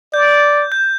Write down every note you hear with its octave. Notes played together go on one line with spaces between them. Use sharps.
D5 G6
G6